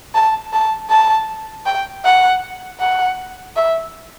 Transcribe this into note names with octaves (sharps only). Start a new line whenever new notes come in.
A5
A5
A5
G5
F#5
F#5
E5